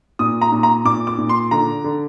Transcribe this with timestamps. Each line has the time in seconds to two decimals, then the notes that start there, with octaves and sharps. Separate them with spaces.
0.19 A#2 D#6
0.41 A#5
0.52 A#2
0.63 A#5
0.85 A#2 D6
1.07 D6
1.18 A#2
1.29 C6
1.51 D3 A#5
1.84 D3